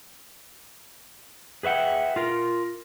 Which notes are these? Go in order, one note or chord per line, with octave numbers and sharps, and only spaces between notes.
G#4 B4 E5 F#5 G5
F4 A#4